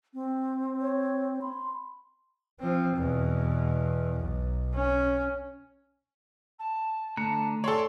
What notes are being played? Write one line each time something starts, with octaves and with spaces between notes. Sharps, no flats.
C4
C#5
B5 C6
F3 C4
E2 B2
B1
C#4
A5
D3 A3 A5 A#5 F#6
A4 C#5 D5 C6